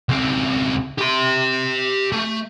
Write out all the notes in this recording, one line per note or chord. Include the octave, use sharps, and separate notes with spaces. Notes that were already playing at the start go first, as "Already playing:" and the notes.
C#2 C4
G4 C6
A3